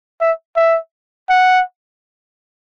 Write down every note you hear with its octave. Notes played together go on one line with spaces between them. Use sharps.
E5
E5
F#5